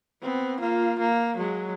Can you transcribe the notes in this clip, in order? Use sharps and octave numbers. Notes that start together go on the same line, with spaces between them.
B3 C4
A#3 F4
A#3
F#3 G#3